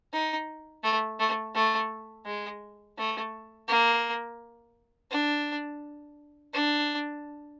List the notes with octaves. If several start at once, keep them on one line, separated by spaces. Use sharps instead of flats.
D#4
A3
A3
A3
G#3
A3
A#3
D4
D4